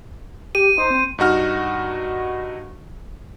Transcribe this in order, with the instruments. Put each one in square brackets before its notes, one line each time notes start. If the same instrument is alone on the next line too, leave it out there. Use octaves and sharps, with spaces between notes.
[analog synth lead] G4 [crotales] D#7
[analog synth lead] D#4 [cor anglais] C5
[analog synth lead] C4
[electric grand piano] G2 D#4 F#4 F6